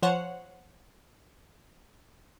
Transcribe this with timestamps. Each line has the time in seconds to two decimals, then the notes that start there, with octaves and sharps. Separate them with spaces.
0.02 F3 C5 C#5 F#5